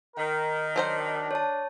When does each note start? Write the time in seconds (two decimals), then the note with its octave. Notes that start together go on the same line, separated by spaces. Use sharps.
0.16 D#3 A#4
0.76 F#3 D4 C5 A#5
1.31 C#5 A5